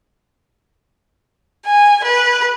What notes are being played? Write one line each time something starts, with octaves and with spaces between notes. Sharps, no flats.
G#5
B4